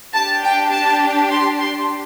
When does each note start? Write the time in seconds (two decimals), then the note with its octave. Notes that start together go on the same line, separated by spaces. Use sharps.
0.14 D4 G4 A5
0.43 G5
0.72 A5
1.30 C6
1.58 C6